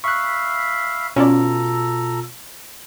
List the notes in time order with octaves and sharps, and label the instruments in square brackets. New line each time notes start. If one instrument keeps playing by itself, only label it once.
[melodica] E5 F5 B5 [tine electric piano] C#6 F#6
[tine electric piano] B2 F4 [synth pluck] C#4 D5 [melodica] A4 A#5